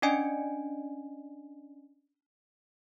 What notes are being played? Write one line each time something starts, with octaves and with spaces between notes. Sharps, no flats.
C#4 D4 D5 D#5 G#5 D7